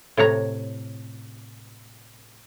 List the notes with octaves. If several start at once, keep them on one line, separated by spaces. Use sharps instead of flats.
A2 C3 C#5 A#5